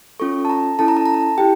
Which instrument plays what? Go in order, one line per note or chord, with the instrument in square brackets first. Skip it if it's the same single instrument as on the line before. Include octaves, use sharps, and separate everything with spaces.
[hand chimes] C#4 F4 A4 C#6
A5
A#5
C#4 E4 A4 A5
A#5
A5
A#5
A5
E4 G4 G5